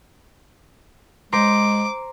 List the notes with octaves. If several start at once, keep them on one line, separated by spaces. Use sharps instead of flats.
G#3 C5 A#5 D6